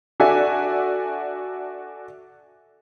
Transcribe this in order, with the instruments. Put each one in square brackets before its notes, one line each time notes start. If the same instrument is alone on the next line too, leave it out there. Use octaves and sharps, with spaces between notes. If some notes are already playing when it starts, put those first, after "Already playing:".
[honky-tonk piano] D4 F#4 A4 D5 E5 G#5